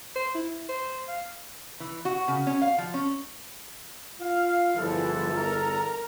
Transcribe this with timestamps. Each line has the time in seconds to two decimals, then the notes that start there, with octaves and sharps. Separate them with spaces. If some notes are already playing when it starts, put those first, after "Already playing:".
0.16 C5
0.35 E4
0.69 C5
1.08 F5
1.80 E3
2.05 F#4
2.28 C#3
2.47 C#4
2.62 F5
2.78 F3
2.94 C#4
4.21 F4 F5
4.77 G1 E2 E3 F3 A4
5.34 A#4 A#5